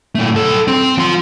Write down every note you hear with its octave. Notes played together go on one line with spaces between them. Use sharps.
A#2 A3
B1 A4
C4 C6
F3 C6